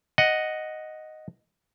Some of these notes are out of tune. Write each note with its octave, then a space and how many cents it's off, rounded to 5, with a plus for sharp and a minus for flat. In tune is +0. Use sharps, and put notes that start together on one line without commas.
D#5 +0 F#5 +0